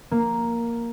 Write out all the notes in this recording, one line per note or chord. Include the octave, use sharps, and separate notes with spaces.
A#3